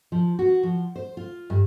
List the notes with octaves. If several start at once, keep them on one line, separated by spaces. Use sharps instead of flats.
F3
F#4
F3
C5
F4
G2